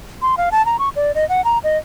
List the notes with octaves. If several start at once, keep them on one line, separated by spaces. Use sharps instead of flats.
C6
F5
A5
A#5
C#6
D5
D#5
F#5
A#5
D#5